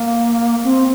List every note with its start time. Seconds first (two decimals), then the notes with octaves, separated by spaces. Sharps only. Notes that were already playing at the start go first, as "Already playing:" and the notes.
Already playing: A#3
0.64 C4